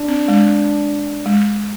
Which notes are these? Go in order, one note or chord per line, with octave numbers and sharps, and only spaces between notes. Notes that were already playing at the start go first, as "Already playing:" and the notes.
Already playing: D4
C4
G#3
G#3